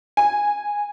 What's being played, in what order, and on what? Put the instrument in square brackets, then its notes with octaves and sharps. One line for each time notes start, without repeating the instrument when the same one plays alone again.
[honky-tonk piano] G#5